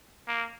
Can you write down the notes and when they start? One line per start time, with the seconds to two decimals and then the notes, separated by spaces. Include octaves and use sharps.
0.28 A#3